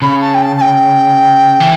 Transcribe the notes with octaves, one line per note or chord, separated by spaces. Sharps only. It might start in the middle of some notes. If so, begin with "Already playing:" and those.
C#3 B5
A5
G5
A5
A5
G5
E3